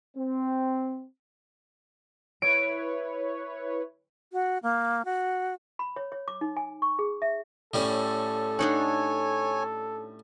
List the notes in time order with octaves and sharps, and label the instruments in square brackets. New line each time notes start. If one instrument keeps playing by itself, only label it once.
[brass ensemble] C4
[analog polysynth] E4 B4 C#5 [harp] D7
[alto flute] F#4
A#3
F#4
[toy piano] B5
C#5
C#5
D6
D#4
G#5
C#6
G#4
E5
[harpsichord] A2 G3 C#4 [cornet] A4
[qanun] D4 D#4 F#5 [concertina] C#5 G#5